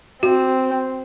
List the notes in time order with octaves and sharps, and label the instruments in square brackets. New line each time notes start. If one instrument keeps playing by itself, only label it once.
[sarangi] C4 [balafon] F#4